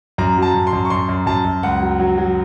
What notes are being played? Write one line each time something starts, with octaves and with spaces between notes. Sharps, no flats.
F#2 A#5
F#3
A5
F#2
C6
F#2
C#6
F#2 C6
F#2
F#2 A5
F#2
C#2 F#5
F#3
F#3
F#3